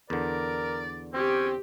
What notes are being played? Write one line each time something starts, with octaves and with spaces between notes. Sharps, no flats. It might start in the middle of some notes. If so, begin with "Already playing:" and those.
E2 D3 A#4 D5
C4 C#4 G4